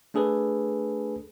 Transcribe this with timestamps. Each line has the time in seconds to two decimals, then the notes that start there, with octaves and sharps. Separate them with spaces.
0.14 A3 D4 G#4 A4 B4